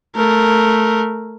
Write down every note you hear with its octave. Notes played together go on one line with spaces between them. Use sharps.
A3 A#4